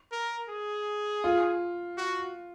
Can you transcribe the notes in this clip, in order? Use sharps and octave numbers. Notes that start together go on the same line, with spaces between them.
A#4
G#4
F4
F#4